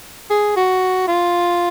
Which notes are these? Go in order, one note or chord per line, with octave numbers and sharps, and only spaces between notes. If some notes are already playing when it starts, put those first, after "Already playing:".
G#4
F#4
F4